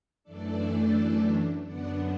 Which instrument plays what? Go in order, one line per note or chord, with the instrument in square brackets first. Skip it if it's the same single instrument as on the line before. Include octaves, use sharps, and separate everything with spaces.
[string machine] F#2 E3 A3 D4 A4 D5
F#2 D3 B3 D4 D5 F#5